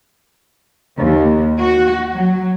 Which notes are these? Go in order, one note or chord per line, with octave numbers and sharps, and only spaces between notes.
D#2
F#4
F#3